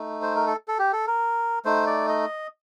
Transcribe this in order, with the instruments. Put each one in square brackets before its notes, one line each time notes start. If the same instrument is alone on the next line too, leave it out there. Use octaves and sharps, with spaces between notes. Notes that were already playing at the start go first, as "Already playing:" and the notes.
Already playing: [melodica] A3 D#4
C5
A#4
A4
A4
G4
A4
A#4
A3 D#4 C5
D5
D#5